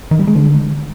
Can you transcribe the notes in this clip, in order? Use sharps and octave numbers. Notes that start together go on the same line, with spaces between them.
D#3
G3
G#3
D3